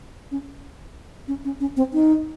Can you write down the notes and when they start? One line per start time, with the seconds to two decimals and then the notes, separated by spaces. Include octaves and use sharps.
0.31 C#4
1.28 C#4
1.45 C#4
1.60 C#4
1.77 C4
1.93 D#4